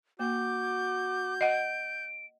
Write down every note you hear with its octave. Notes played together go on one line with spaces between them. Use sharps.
A#3 F#4 D6 G6
D#5 F#5 D7